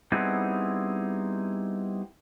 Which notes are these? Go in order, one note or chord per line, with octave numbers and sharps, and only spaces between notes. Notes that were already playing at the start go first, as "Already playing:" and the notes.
G3 B3 C4 D#4 E4 G#4